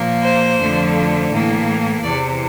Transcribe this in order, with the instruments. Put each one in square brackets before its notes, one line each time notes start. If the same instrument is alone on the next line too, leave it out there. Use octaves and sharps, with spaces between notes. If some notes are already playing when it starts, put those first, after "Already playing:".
Already playing: [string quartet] A#2 F3 A#3
C5
F2 D3 F3 A3
A2 E3 A#3
E2 C3 E3 D5